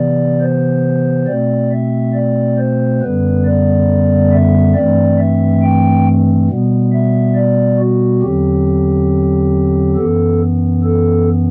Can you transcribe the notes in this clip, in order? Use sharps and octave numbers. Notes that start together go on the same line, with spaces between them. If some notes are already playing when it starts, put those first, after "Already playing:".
Already playing: C3 E3 B3 D5
C5
B2 A3 C4 D5
E5
D5
C5
F#2 D3 G3 B3 B4
D5
E5
G2 E3 A3 C4 D5
E5
G5
B2 G3 B3
E5
D5
F#4
E2 D3 F#3 C4 G4
F#2 E3 B3 A4
A4